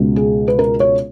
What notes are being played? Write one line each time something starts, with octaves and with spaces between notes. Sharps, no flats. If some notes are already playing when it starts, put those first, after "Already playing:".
Already playing: C#2 B2 G#3
G#4
B4
A#4
C#5